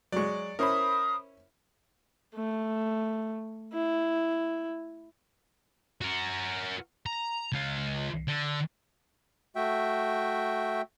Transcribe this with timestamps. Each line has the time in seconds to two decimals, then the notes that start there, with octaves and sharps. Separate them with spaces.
0.12 F#3 G#3 D5 C#6
0.59 C#4 E4 A#4 C5 B5 D#6
2.35 A3
3.73 E4
6.01 F#4 A#4
7.06 A#5
7.52 C#2 F4
8.28 D3
9.56 A3 F#4 E5 G5